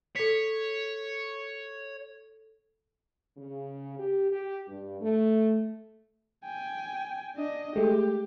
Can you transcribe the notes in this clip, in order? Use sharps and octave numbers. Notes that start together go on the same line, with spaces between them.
A4 C#5 B6
C#3
G4
G4
G2
A3
G5 G#5
D4 D#5
G#3 A3 G4